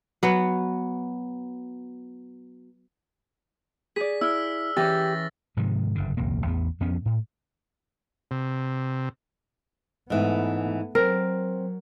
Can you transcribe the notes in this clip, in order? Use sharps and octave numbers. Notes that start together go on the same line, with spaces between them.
F#3 B3
G#4 D5 B6
E4 E6 F6
E3 C#4 G4 A6 A#6
G#2 C3 D#3 F3
F#1 G2 D3
D#1 C2 F2 A#3
A1 E2 B3
F2 F3 B3 C#4
A2
C3
G#2 E3 A3 B3
F#3 C4 A#4